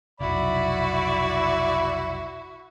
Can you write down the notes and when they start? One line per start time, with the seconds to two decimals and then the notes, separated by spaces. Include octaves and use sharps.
0.20 F1 B1 E4 F#4 D5 E5 B5